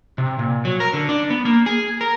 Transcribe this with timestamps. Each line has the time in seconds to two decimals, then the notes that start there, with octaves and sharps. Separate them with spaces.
0.18 C3
0.39 A#2
0.65 F#3
0.80 A#4
0.93 D3
1.09 D4
1.30 B3
1.45 A#3
1.66 G#4
2.01 A#4